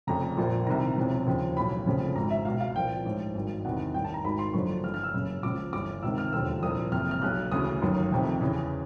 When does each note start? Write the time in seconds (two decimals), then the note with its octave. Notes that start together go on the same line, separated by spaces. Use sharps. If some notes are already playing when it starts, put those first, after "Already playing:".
0.07 F1 F2 C#3 A#5
0.37 A#1 A#2 F3
0.67 C2 C3 D#3 A#5
0.97 E1 E2 C3 F3
1.27 D#2 C#3 F3
1.56 B1 A2 E3 B5
1.86 F1 F2 C#3 F3
2.15 G#1 G#2 E3 A#5
2.31 E5
2.45 C#2 B2 F5
2.61 F5
2.75 C2 A#2 F3 G5
3.05 A1 G#2 F3
3.35 G#1 G2 D#3
3.65 E2 C3 D#3 F#5
3.94 A1 G2 D#3 G5
4.05 A5
4.14 A#5
4.24 G#1 G#2 D#3 B5
4.39 C6
4.53 F#1 F#2 D3 F3 C#6
4.83 G1 G2 E3 F6
4.94 F6
5.04 E6
5.14 F#1 F#2 C#3
5.43 C#2 C#3 F3 D6
5.73 G1 G2 E3 D6
6.03 C#2 C3 D#3 E6
6.18 F6
6.33 E1 D#2 D3 F3 E6
6.62 C2 A#2 F3 D#6
6.92 F#1 F2 C3 F6
7.11 F6
7.21 B1 B2 F#6
7.51 D2 C#3 E3 D#6
7.82 G1 F#2 D#3
8.11 F1 F2 C3 D#3
8.41 E2 C#3 E3